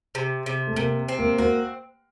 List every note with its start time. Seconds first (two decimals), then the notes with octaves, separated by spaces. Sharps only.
0.15 C3
0.46 C3
0.67 A3
0.76 C3 A#3
1.08 C4
1.18 A#3
1.38 A#3 F#4